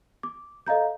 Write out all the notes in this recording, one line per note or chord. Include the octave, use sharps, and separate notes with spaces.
D6
A4 D#5 F5 A#5 G6